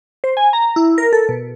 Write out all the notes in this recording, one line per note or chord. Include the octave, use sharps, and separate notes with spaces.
C5
G#5
A#5
E4
A#4
A4
B2